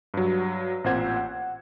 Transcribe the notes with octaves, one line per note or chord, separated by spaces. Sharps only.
G2 F#3
A1 A#2 C4 C5 F#5 G#6
F#5